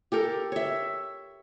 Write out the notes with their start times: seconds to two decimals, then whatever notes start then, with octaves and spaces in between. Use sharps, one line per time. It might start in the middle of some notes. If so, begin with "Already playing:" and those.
0.12 G4 A4 A#4
0.52 C#5 E5